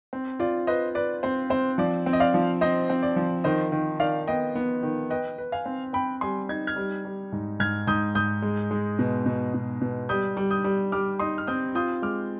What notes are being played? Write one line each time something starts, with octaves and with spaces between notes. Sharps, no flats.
C4
F4 D5
B4 C5 D#5
B4 D5
C4 C5
C4 C5
F3 D5
C4
D#5
D5 F5
F3
C4 C5 D#5
C4
D5
F3
D#3 C5 D#5
D#3
D#3 D5 F5
B3 D#5 G5
B3
D#3
B4 D#5 G5
B4
F5 G#5
C4
C4 G5 B5
G3 G#5 C6
D#4 G#6
F6 G#6
G3
G3
G#2
G#2 F6 G#6
G#2 D#6 G6
G#2 D#6 G6
G#3
G#3
B2
B2
B2
B2
G3 D#6 G6
G3
D#6 G6
G3
G3 D6 F6
D#4 C6 D#6
F6
C4 D#6 G6
F4 D#6 G6
G#3 D6 F6